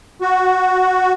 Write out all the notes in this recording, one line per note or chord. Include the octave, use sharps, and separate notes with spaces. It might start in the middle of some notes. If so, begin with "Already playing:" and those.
F#4